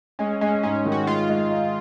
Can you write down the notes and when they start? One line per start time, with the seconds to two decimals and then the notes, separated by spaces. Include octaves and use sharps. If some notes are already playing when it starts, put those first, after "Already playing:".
0.19 G#3 C#4
0.41 G#3 C#4
0.63 G#2 C#4
0.85 D#3
0.92 F#4
1.06 G#3 F4
1.29 G#3
1.50 D#4